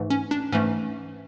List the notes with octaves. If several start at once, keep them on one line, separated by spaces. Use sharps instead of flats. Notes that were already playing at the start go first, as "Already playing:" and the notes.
Already playing: G#2 E3 A3
C#4
D4
G#2 E3 A3 C#4